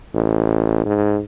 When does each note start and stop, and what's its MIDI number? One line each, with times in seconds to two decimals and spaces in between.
0.14 0.81 33
0.85 1.20 44